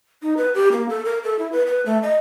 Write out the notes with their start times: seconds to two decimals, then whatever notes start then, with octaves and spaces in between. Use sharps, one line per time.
0.23 D#4
0.37 B4
0.55 G4
0.72 A#3
0.89 A4
1.05 A#4
1.24 A4
1.39 E4
1.52 B4
1.67 B4
1.86 A3
2.03 D#5